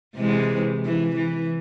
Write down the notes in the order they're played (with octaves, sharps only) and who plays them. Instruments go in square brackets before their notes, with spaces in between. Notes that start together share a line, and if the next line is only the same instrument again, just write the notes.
[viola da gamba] C3 E3 G#3
E3
E3